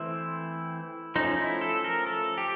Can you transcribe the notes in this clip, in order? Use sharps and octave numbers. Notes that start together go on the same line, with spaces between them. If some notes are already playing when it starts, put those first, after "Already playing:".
Already playing: E3 A3 C4 E4
F3 A3 C#4 D#4
E4
A4
A#4
A4
G4